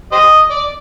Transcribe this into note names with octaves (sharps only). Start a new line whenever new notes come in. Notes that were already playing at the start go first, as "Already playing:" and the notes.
G4 C5 D#5
D5